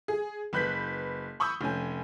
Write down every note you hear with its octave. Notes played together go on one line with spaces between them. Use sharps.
G#4
F#1 B4 F#6 G6 B6
B5 C#6 D#6 E6 G6
F1 C#4 G#5